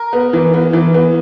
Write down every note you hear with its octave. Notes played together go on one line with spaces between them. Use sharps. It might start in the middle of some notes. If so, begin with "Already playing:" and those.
Already playing: A#4
B3
E3
B3
E3
B3